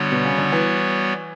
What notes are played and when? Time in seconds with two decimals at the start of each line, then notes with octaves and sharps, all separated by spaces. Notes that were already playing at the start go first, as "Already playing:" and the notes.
Already playing: D3 G3 B3 F#4 C#5
0.12 B2
0.24 C#3
0.38 D3
0.52 E3